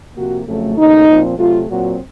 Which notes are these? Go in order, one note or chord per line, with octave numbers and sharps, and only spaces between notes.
C3 F3 A#3 F#4
F2 C#3 F#3 A3
D#2 C#3 A3 D#4
A#2 F3 C4
C3 F#3 A3 F4
A#2 F#3 C4 F#4